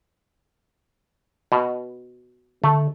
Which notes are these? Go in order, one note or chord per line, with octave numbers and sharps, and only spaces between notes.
B2
D3 A3